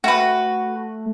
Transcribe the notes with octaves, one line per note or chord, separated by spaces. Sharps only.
A3 F#4 B4